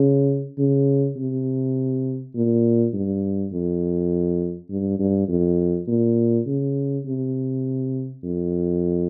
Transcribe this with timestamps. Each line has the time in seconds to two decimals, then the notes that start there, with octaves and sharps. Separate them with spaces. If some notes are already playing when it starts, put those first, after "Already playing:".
Already playing: C#3
0.58 C#3
1.17 C3
2.35 A#2
2.94 G2
3.52 F2
4.70 G2
4.99 G2
5.29 F2
5.88 A#2
6.47 C#3
7.06 C3
8.23 F2